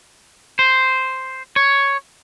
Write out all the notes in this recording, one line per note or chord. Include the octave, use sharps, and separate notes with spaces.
C5
C#5